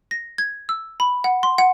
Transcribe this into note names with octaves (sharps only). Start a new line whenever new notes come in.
A#6
G#6
E6
B5
F#5
C6
F#5